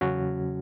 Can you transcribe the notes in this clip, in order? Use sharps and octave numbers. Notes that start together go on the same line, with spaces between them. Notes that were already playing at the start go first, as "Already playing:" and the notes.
E2 C#3 F#3 C#4 F#4